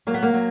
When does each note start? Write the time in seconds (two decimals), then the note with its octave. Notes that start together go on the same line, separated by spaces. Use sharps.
0.07 F#3 A#3
0.14 B3
0.23 A#3
0.34 F#3